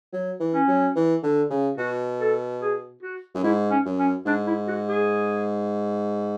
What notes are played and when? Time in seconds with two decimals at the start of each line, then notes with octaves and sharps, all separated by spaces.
0.13 F#3
0.40 E3
0.54 C#4
0.68 F#3
0.96 E3
1.23 D3
1.50 C#3
1.77 B2 F#4
2.19 A4
2.61 G#4
3.03 F#4
3.35 F#2
3.44 G#2 E4
3.71 C#4
3.85 F#2
3.99 C#4
4.26 G#2 D4
4.47 E4
4.68 F#4
4.89 G#4